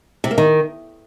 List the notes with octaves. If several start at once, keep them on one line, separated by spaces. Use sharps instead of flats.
C3
A#3
D#3